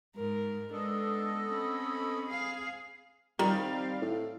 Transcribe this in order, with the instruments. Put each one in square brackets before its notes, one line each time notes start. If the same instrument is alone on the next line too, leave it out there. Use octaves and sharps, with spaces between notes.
[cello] G#2 [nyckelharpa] A#4
[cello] G#3 [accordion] B3 A4 D#5 [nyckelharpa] D4
[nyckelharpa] C4 B5 [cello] C#4
[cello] G#4 F5
[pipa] D#3 [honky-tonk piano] G3 [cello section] C4 F5
[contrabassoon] A2